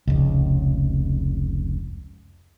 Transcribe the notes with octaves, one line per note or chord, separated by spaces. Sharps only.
F1 C#2